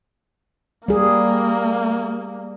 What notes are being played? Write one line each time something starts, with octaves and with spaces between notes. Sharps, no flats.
G3 A#3 G#4